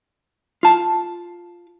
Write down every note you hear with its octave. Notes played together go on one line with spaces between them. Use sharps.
F4 A5